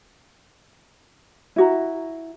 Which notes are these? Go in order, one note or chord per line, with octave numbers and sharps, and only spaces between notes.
E4 F#4 A#5